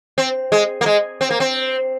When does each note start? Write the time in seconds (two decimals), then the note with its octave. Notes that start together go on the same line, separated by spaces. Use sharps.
0.18 C4
0.52 G#3
0.81 A#3
0.86 G#3
1.21 C4
1.30 A#3
1.40 C4